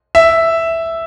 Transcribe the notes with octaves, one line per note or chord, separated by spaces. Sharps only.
E5